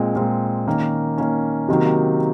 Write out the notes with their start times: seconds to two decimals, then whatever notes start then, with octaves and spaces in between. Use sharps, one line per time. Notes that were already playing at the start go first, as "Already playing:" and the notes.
Already playing: A#2 G#3 C4
0.15 A#2 G#3 C4
0.67 D#3 A#3 C#4
1.18 D#3 A#3 C#4
1.69 C3 D#3 F#3 A#3